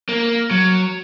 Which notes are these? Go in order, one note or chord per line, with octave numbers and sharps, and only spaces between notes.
A#3
F#3